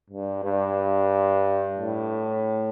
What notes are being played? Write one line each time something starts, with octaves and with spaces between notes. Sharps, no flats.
G2
G2
A2